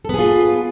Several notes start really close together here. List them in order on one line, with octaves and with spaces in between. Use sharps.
A4 B3 G#4 F4